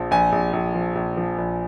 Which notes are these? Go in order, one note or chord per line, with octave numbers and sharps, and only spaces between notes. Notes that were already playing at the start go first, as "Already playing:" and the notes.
Already playing: A#1 F3
A#1 G#5
A#1
A#1
F3
A#1
F3
A#1